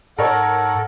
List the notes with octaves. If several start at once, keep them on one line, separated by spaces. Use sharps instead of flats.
G#2 A4 A#4 C#5 F#5